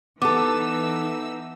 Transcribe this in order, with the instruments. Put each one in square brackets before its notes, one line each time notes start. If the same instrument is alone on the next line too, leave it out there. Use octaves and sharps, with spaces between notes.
[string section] E3 D#4 E6 [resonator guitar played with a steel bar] B3 A4 [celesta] D6